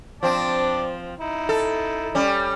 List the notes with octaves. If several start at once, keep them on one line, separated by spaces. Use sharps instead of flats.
F3 C4 D5 A5
D#4 E4
A4
G3 C#4